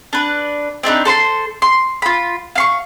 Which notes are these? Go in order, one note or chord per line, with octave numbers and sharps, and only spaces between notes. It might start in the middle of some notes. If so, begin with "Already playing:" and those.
D4 B4
C4 D4 D#4 B4
A4 C5 B5 C6
C6
F4 B5
F5 C6 C#6